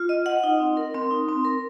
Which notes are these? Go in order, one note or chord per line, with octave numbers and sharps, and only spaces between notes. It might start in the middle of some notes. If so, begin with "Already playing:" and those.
Already playing: F4
D#5
F#5
D#4
C4
A#4
C4
D#4
C4
A#4